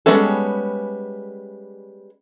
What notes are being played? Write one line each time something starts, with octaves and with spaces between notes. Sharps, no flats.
G3 G#3 B3 C#4 A4